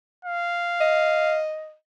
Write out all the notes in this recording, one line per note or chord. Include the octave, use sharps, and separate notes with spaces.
F5
D#5